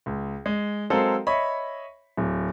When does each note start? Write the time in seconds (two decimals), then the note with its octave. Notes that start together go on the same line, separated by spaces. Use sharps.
0.06 C#2
0.46 G#3
0.90 F#3 G#3 C4 A4 A#4 F5
1.27 C#5 D#5 E5 B5 C#6
2.17 D1